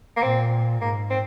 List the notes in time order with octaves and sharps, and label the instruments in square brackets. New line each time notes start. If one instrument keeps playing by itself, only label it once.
[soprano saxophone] A#3
[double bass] A#2 [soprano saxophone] C4
[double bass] G#2 [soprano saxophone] A#3
[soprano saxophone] C4